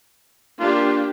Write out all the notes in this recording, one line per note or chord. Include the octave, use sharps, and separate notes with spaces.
A#3 D4 F4 G4